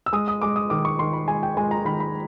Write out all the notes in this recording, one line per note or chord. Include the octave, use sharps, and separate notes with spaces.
E6
G#3 D#6
D#6
G#3 D6
D#6
D#3 D6
C#6
D#3 C6
B5
G#3 G#5
G5
G#3 G#5
A#5
D#3 B5
B5